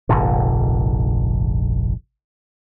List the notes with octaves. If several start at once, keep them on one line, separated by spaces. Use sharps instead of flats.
F1 A#1 G#2 D3